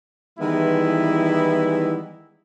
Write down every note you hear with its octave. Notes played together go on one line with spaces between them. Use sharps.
D#3 E3 G3 G#3 B3 E4